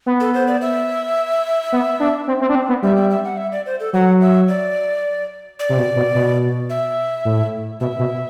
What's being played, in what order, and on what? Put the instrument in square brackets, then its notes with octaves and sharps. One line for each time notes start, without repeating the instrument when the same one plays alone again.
[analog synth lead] B3
[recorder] A4
C5
D5
E5
[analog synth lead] B3
D4
C4
C4
D4
C4
B3
[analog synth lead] G3 [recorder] E5
[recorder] E5
E5
F#5
E5
D5
C5
A4
[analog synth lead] F#3 [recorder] F#5
[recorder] E5
D5
D5
[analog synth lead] C3
B2
B2
B2
[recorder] E5
[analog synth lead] A2
[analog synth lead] B2 [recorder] E5
[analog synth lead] B2